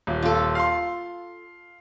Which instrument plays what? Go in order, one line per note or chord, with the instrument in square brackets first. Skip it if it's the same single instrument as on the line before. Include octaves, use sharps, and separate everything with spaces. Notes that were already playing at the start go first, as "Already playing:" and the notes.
[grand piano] D#1
[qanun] F4 A4
[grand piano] F5 C6